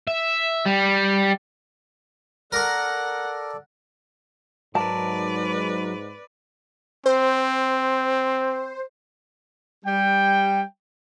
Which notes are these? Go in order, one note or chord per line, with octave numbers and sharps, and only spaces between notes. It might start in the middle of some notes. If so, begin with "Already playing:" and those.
E5
G3
A4 A#4 D5 F#5 C#6
G#2 F#3 A#4 B4 D5 A5
C4 C5
G3 G5